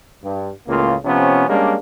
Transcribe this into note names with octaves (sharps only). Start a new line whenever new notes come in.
G2
C#2 A2 C#3 A#3 F4
C3 F3 B3 C#4
G3 G#3 A#3 C#4 D4